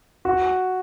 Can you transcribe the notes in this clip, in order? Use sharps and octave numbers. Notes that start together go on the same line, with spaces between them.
F#4